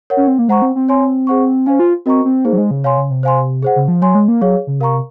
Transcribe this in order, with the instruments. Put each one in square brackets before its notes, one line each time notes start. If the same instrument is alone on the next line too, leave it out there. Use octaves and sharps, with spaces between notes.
[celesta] A#4 C#5 F#5
[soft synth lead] C#4
C4
A#3
[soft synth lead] G#3 [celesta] C5 F#5 A#5 C#6
[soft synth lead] C4
C4
[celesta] C#5 G#5 C6
G#4 C5 F#5 C#6
[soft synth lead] C#4 [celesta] C5 F5 G#5
[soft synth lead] F4
[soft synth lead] C4 [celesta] F#4 A#4 D#5 A#5 C#6
[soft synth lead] C4
[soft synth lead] A#3 [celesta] D#4 G#4 C5
[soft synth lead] F#3
G#3
C#3
[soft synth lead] C3 [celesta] C#5 F5 G#5 C6
[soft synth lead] C#3
C3
[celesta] C5 F5 G#5 C6
G#4 C5 F#5
[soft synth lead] C#3
F3
[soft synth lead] F#3 [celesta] C#5 G#5 C6
[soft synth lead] G#3
A#3
[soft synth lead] F#3 [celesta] G#4 C#5 F5
[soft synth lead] C#3
[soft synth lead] C3 [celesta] A#4 F5 A#5 C#6